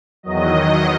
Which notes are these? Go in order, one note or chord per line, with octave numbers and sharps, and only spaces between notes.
E2 D#3 F#3 D#5